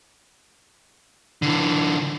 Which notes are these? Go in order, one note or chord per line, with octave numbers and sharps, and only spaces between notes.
D3 E3